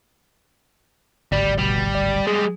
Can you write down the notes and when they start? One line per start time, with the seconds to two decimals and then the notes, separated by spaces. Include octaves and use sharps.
1.32 D1 G#1 D2 G3 D5
1.58 B2 G3
1.95 D5
2.27 G3 G#3 G#4